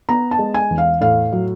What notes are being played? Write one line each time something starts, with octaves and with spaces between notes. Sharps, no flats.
B3 A#5
A5
G#3
G#5
E2
F5
A2 F5
F#3